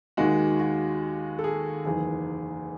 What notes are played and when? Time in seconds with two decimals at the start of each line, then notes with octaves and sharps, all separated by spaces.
0.17 D#2 D#3 G#3 F#4
0.59 F#4
1.39 A4
1.44 G#4
1.85 F#1 E2 D#3 G#4